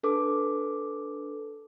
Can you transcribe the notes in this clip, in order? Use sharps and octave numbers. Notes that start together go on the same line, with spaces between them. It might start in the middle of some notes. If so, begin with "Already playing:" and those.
D4 A4 B4 D6